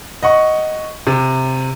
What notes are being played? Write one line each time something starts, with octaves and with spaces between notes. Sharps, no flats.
D#5 F#5 C#6
C3